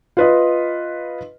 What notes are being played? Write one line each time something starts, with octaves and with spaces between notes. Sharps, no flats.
F4 B4 D#5